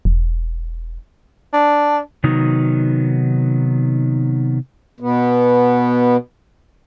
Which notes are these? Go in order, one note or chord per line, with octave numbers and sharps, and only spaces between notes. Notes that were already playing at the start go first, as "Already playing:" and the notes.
E1
D4
C3 D#3 F#3 B3 D#4
B2 B3